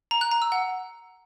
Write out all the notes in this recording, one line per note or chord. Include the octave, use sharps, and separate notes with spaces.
A#5
F#6
A#5
E6
F#5